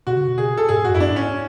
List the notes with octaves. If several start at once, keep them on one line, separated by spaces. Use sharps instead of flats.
B2 F#4
C#3
B2
G#4
A4
G#2 G#4
F#2 F#4
E4
D4
G#2
C#4